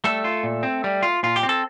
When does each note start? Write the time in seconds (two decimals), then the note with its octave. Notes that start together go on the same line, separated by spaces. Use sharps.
0.04 G3 A3 A4
0.24 F4
0.43 A#2
0.63 C4
0.84 G3
1.03 F4
1.23 A#2 F4
1.36 G4
1.43 C4
1.49 A4